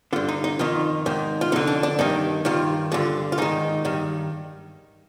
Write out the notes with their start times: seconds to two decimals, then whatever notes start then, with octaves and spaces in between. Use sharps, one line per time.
0.13 D3 F4
0.16 G2
0.28 D#4
0.44 D#4
0.59 F2 D#3 F4
1.06 G#2 D#3
1.41 F4
1.52 F2 D#4
1.56 D3
1.67 D4
1.83 D4
1.99 G2 D#3 D#4
2.45 G2 D#3 F4
2.92 G2 D3 F4
3.32 F4
3.38 G#2 D#3 D#4
3.85 G2 D#3